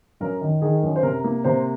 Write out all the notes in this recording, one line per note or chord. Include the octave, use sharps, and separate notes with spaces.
F#2 A#4
D#3
D#3 G#4
F#2
C5
C3 A#4
A#3
C3 C5